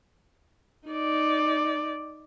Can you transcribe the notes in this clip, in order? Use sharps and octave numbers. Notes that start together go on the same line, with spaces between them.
D#4 D5